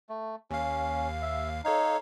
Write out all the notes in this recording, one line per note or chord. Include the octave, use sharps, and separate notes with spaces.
A3
D#2 C#4 F5
E5
D#4 A4 C#5 F5